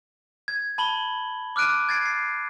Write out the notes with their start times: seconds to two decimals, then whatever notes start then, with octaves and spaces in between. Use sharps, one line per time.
0.48 G#6
0.78 A5 B5 F#7 G7
1.56 D6 F6 F#6 D7 D#7
1.89 G#6 A6 C7 D7
2.06 C7